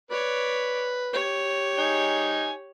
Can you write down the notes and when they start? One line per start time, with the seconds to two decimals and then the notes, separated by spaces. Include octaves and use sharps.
0.11 B4 C#5 D5
1.13 G4 C#5
1.78 D#4 G#5